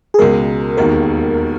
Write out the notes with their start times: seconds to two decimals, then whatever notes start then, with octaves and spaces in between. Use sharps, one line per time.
0.14 G#4
0.19 C#2 B2 G#3 A#4
0.77 E1 D#2 D#3 A#4